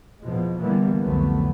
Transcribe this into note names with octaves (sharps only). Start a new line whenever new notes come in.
E2 B2 F3 G#3
D3 E3 G3 A#3 B3
C2 F2 D3 F#3 A3 B3